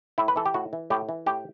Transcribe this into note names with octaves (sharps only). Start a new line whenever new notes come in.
A2 E4
B4
E3 A4
G4
A2 F#4
E3
A2 G4
E3
A2 G4